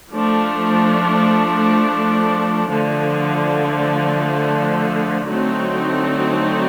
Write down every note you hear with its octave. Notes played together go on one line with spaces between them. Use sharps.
F3 A3 D4
D3 F3 A3
D3 F#3 A3 C4 D#4